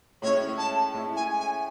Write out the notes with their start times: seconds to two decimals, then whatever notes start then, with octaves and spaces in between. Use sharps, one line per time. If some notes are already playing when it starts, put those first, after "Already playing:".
0.22 A2 G#3 C#4 E4 C#5
0.58 A5
0.93 A2 G#3 C#4 E4
1.16 G#5
1.40 G#5